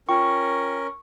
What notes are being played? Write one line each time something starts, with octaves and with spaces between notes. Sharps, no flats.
C#4 F4 A#4 G5 C#6